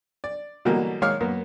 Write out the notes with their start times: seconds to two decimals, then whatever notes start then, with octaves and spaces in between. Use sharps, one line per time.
0.24 D5
0.65 B2 D3 E3 F#3 G3 A#3
1.02 D#3 G#3 C#5 F5 D6 F6
1.21 F#2 A#3 B3